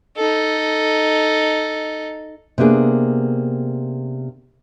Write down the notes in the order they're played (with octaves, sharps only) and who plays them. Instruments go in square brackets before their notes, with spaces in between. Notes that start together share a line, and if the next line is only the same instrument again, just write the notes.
[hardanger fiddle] D#4 A4
[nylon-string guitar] C3 A#3 B3 D4 G#4